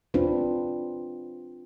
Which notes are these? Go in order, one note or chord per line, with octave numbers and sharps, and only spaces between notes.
C4 D4 F4 B4